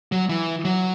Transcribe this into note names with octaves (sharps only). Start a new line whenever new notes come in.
F#3
E3
F#3